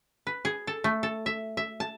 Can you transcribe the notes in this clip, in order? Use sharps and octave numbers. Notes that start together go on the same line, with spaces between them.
B4
G#4
A4
A3
A4
E5
E5
A5